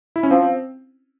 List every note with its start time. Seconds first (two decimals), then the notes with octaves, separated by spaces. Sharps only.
0.16 E4
0.23 C#4
0.31 F3 C4